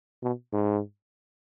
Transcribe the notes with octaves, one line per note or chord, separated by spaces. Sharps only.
B2
G#2